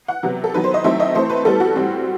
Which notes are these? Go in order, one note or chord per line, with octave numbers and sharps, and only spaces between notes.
F#5
C3 F#3 B3
A4
D#3 F#3 B3 B4
C5
D#5
D#3 F#3 A3 C4 E5
D#5
E3 A3 C4 C5
B4
E3 G3 B3 A4
F#4
A2 G3 C4